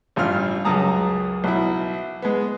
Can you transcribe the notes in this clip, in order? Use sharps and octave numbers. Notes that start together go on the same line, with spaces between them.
A1 G2 F4 F6
C#2 F#2 G#4 A5 A#5 D#6
B1 E4
G#3 B3